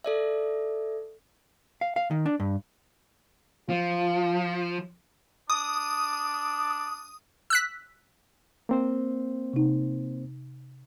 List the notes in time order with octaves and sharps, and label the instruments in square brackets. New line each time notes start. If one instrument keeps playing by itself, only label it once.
[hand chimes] A4 D5 E5
[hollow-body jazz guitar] F5
F5
D#3
D4
G2
[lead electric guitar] F3 [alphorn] F4
[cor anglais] D4 [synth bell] D#6
[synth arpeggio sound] E6 F#6 B6
[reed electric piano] A#3 C4 C5
[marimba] C3 D#4